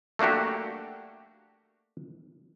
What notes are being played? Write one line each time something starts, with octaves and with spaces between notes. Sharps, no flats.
A3 A#3 D4 F#4 G4